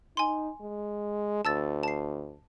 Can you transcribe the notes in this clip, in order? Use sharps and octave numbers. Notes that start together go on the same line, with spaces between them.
D#4 G#5 C6
G#3
D2 A5 E6 A6
A5 C7